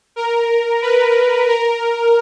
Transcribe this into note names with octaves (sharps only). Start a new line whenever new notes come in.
A#4
B4
A#4